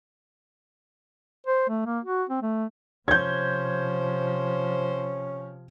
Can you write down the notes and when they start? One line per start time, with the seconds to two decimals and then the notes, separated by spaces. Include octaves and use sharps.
1.47 C5
1.69 A3
1.86 A#3
2.05 F#4
2.29 C4
2.42 A3
3.08 C3 F3 C#4 C5 G6 G#6